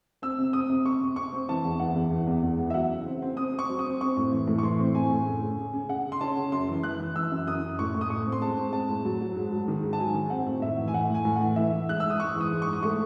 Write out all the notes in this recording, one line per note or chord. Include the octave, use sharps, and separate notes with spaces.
C4 E6
C3
C4 D#6
C3
C3 C#6
C3
C3 C#6
C4
E3 A5
E2
E3 F#5
E2
E3
E2
E2
E3
E5
F#3 F#5
C#3
C4
C4
C4 D#6
C4 C#6
F#3
D#6
C4
C4 C#6
A2
E3
A2
C#6
E3 C6
C4
A2 G#5
A2
C#3
C#3
C#3
C#3
C#3 F#5
C#3
C6
C#4 A5
C#3
F#2 C6
E3
E3 F#6
E3
E3 E6
F#2
F#2 D#6
F#2
A2 C#6
A2
D#6
A2 C#6
C4
C6
G#3 A5
C4
G#3 A5
A2
F#3
F#3
G#2
F#3
D#3
G#2
A5
F#3 G#5
D#3
C4 F#5
A2
A2 E5
E3
G#5
A2 F#5
A2
G#5
A2
F#5
E3
E3 E5
E3
G#2 F#6
G#2 E6
D#6
G#2 C#6
E3
D#6
G#2
C#6
G#2
D#6
A3 C#6